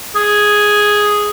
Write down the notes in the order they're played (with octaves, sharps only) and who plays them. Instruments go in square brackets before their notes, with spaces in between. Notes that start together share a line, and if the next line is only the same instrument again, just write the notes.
[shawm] G#4